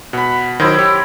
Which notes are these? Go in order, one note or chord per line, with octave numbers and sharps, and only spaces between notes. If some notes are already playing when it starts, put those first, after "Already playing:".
B2 F#5 B5
D#3 F#3 E4 C5 D#5
G4 C#5